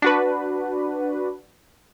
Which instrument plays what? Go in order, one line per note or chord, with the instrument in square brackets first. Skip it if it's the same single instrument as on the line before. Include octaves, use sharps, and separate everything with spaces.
[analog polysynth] D4 F#4 B4